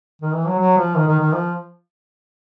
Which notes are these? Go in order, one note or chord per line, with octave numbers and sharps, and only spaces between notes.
D#3
E3
F#3
F#3
F3
D#3
D#3
D#3
F3